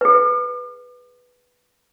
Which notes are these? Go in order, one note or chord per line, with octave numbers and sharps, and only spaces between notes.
G#4 B4